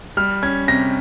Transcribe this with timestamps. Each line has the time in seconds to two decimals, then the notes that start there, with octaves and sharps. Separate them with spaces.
0.17 G3 F6
0.43 C#4 G#6
0.68 C3 A#6